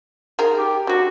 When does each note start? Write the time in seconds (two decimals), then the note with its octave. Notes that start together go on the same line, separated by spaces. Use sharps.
0.39 D#3 G#4 A#4
0.58 G4
0.87 D3 F#3 F#4